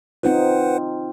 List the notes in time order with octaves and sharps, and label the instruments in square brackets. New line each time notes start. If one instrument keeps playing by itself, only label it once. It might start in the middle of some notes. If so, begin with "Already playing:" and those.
[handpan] C4 D#4 F4 [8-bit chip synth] B4 C5 F#5